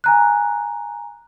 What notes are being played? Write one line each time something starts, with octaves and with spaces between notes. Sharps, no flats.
G#5 A#5 F#6